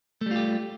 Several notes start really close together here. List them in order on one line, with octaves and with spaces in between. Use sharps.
A3 G3 F4 G4